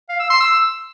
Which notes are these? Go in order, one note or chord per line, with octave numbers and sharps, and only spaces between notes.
F5
E6
C6
E6